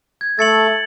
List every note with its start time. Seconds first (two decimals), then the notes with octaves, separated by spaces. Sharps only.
0.21 G#6
0.39 A3 A4 A6 C#7 F#7